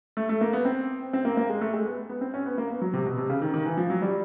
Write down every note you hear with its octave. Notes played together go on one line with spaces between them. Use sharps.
A3
A3
A#3
B3
C4
C4
A#3
A#3
G#3
A3
G#3
B3
B3
C4
C#4
B3
A#3
B3
F#3
C3
B2
C3
C#3
D#3
D#3
E3
F3
F#3
G3